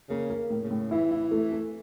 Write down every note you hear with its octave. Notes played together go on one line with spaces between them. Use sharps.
C#3 A#3
A#3
A2
C#3
A2
E3 E4
E4
A3
A3